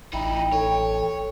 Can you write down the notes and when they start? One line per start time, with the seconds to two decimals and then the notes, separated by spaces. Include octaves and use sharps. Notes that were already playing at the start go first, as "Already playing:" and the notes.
0.13 A1 D#4 E4 G5
0.53 A4 C#5